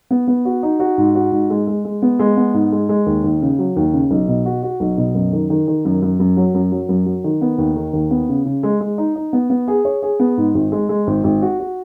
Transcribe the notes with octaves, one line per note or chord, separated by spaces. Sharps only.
B3
B3
F#4
D#4
F#4
G#2
F#4
G#2
G#3
G#3
G#3
B3
G#3
B3
G#2
G#3
G#3
D#2
D#2
C#3
F#3
D#2
C#3
B1
B2
F#4
F#4
B1
B2
F#2
D#3
D#3
D#3
F#2
F#2
F#2
F#3
F#2
F#3
F#2
F#3
D#3
B3
D#2
D#3
D#2
B3
C#3
C#3
G#3
G#3
D#4
D#4
B3
B3
G#4
C#5
G#4
B3
G#2
G#1
G#3
G#3
G#1
G#1
F#4
F#4